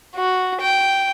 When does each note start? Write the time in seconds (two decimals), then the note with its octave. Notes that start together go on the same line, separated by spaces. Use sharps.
0.16 F#4
0.61 G5